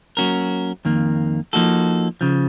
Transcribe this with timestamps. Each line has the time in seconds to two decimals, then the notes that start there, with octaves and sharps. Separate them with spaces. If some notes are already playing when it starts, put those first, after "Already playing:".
0.17 F#3 A#3 C#4 F#4 A#4
0.85 F2 D#3 A#3
1.53 F3 A#3 D#4 F#4 A4
2.21 C#3 F3